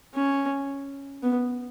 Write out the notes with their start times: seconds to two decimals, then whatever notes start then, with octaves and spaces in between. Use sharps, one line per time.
0.15 C#4
1.23 B3